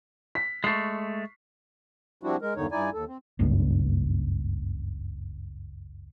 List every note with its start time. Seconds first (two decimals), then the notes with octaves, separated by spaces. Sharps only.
0.35 B6
0.64 G#3 A3 C#6 C7
2.23 F3 G3 C4 D4 E4 F#4
2.42 G#3 A#4
2.56 E2 G2 D3 D#3 D#4 C#5
2.71 G2 D#4 E4 D5 G#5
2.93 D#2 A4
3.08 C4
3.39 F#1 C#2 G2